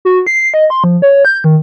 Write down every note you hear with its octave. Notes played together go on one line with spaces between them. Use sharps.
F#4
C7
D#5
C6
F3
C#5
G6
D#3